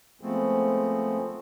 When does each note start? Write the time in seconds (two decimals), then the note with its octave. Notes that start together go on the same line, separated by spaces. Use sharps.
0.21 F3 G#3 A3 B3 C4